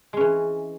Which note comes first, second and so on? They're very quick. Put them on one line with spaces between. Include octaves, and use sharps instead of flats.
G#3 C#4 E3